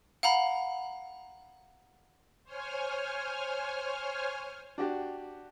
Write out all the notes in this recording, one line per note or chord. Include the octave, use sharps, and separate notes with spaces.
F5 F#5 A#5 B5
C5 C#5 G#5 F6
D4 F#4 G4